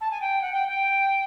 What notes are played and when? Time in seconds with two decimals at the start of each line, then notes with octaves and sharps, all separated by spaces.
0.01 A5
0.11 G#5
0.21 G5
0.42 F#5
0.53 G5
0.68 G5